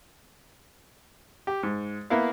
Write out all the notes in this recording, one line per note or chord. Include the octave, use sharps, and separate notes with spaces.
G4
G#2
A#3 B3 E4 F5